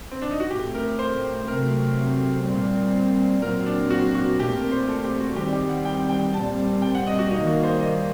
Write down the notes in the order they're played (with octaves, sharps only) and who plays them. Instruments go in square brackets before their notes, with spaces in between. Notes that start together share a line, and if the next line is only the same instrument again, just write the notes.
[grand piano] C4
D4
D#4
F#4
[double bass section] A2 A3 C4 [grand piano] G4
[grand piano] A#4
C5
[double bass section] C3 F#3 A3 C4 [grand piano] A#4
[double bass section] A#2 G3 C4
[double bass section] A#2 F#3 C4 [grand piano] A#4
[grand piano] D4
F#4
F#4
[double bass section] A#2 A3 C4 [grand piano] G4
[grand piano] A#4
C5
A4
G4
F#4
[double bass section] D#3 G3 C4 [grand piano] G4
[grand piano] G4
F#5
G5
G5
[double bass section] A#2 G3 C4 [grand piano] A5
[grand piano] G5
F#5
D#5
F#4
[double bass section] D#3 G3 A#3 [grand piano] D#4
[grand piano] F#4
C5
D#5